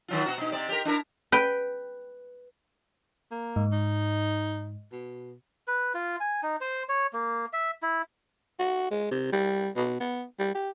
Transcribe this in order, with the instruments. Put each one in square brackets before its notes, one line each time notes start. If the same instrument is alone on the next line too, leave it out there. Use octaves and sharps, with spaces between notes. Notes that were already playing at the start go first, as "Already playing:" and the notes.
[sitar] D#3 F#3 F4
B2 F#4
B2 D#4
C3 C4 D5
G4 A#4
D4 E4 A#4
[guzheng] B4 G5
[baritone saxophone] A#3
[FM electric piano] G#2
[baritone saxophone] D#4
B2
[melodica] B4
F4
G#5
D#4
C5
C#5
A#3
E5
E4
[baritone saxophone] F#4
G#3
C3
G3
B2
B3
G3
G4